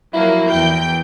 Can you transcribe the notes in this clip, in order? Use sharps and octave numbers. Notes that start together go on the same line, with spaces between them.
F3 F#3 A#3 E4
E2 G5 G6